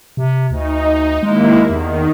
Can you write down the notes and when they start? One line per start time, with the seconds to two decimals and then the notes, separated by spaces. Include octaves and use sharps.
0.17 C3
0.51 D2 D#4
1.23 D#2 G#3 A#3 E4
1.70 E2 D#3